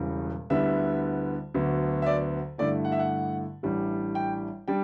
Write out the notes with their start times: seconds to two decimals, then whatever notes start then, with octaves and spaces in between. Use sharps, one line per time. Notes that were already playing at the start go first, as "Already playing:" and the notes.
Already playing: E1 E2 C#3 G3 C#4
0.50 D2 D3 G3 B3 E4 E5
1.54 D2 D3 F#3 B3
2.02 E5
2.06 D5
2.58 G2 D3 A3 E4 D5
2.85 F#5
2.92 E5
2.99 F#5
3.63 A1 A2 G3 D4
4.15 G5
4.68 G3 D4 G5